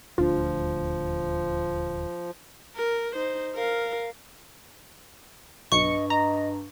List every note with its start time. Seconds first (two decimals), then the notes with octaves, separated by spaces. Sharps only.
0.18 D#1 D2 F3 D4 F4
2.76 A#4
3.15 D#4 C5
3.55 A#4 F5
5.72 B1 G2 D#5 C#6 C#7
6.10 D#5 A#5